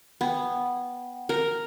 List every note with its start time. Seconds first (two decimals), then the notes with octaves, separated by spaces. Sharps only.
0.21 B3 F#5 G5
1.29 A#4